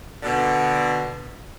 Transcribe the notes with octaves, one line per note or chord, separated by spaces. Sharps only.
B2 D3